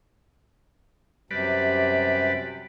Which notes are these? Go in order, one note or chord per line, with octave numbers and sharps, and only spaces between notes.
F#2 C3 G3 B4 D5